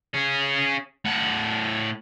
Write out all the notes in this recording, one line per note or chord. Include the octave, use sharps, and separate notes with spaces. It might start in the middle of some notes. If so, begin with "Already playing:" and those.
C#4 G#4
A2 F#5